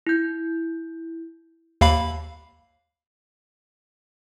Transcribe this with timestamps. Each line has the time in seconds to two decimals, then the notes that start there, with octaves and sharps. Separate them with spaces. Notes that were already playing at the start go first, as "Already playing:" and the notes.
0.07 E4 G6
1.81 D#2 F5 B5